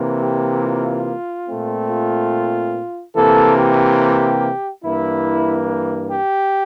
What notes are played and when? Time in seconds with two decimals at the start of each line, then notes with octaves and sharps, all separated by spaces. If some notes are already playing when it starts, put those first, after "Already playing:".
Already playing: C3 E3 A#3
0.22 G4
0.64 F4
1.48 A#2 A3 C4
1.90 F4
3.16 C3 E3 A#3 A4
3.57 G4
4.83 G2 E3 A#3 E4
6.09 G4